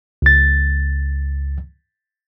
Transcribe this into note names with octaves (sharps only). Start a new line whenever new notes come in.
C#2 A6